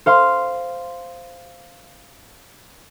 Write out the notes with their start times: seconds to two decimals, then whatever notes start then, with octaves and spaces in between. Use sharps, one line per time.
0.06 C5 F5 C6